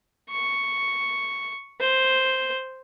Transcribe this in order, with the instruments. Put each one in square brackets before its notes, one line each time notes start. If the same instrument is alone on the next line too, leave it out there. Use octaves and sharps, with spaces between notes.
[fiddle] C#6
C5